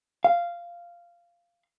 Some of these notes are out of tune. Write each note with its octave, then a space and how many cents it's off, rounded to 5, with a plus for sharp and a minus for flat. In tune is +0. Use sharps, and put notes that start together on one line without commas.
F5 -10